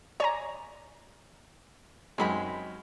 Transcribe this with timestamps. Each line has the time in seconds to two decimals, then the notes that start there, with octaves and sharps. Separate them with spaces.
0.20 C#5 D5 G#5 A#5
2.18 F#2 G#3 C4 D#4 G#4 B5